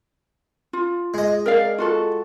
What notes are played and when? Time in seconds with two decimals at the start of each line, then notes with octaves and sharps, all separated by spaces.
0.73 F4
1.14 G#3 D#5
1.46 A#4 D5 F5
1.78 F4 F#4 A4